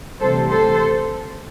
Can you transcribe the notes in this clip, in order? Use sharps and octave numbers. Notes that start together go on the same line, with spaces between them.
D2 C3 E3 G3 A4 C5
A4 C5